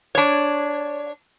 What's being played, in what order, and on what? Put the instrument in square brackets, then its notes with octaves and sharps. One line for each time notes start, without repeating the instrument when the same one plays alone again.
[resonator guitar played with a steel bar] D4 C#5